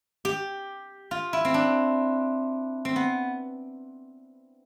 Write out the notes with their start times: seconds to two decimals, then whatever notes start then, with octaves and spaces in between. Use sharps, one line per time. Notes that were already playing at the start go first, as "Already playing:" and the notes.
0.25 G4
1.11 F4
1.33 E4
1.45 C4
1.54 D4
2.85 C4
2.96 B3